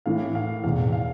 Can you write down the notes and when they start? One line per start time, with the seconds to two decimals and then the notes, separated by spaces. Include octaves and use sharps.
0.06 A2 E3 F5
0.35 F5
0.64 E2 B2 F5
0.93 F5